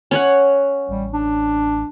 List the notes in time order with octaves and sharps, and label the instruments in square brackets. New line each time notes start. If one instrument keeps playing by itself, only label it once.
[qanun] C#4 C#5 F#5
[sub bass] A1 [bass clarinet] G3
[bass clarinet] D4